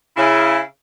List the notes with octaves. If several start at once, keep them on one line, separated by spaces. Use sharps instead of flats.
C#3 E4